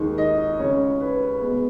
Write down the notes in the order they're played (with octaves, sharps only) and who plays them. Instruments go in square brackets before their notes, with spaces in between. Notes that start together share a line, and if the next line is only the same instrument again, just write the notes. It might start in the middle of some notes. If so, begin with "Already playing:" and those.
Already playing: [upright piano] D#2 D#3 G#3
D#5
C#3 G#3 C#4 C#5
B4
B2 G#3 B3